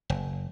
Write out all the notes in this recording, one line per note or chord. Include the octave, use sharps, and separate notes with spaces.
F#1